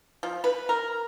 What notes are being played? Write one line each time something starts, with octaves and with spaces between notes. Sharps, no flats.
F3
B4
A#4